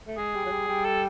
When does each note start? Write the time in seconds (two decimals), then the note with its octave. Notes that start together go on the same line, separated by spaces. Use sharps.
0.07 A3
0.17 G#3 G#4
0.34 G3
0.46 F#3
0.51 G3
0.68 G3
0.85 A4